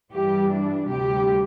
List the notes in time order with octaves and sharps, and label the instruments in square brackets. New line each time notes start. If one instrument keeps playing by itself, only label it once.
[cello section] G2 E3 G3 G4
D4
D2 C3 G3 G4